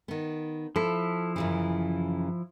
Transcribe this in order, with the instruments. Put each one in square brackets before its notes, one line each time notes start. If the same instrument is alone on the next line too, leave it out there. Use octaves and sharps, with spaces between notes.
[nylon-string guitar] D#3 B3
[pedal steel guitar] F3 E4 [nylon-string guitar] A4
[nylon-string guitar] F#2 C#3 E3